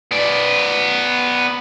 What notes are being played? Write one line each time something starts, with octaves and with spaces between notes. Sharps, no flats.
B3 D5